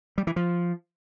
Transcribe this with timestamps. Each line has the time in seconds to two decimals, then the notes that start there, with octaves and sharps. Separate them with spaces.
0.18 G3
0.27 E3
0.36 F3